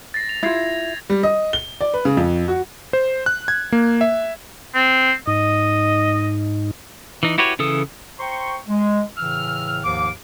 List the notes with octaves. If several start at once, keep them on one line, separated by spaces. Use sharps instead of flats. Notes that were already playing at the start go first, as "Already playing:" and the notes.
A6 A#6 C7
F7
E4 F4 G6 G#6 C7
G3
D#5
G7
D5
B4
C#3
F2
F#4
C5
F#6
G#6
A#3
E5
C4
G#2 D#4 D#5
E3 D#4
E4 F#4 G4 B4 C#5
C#3 E3 A4 D#6
C5 G5 A#5 C6 C#6
G#3
A2 C#3 E3 E6 F6
D#2 G#2 D#3 F3 F5 D6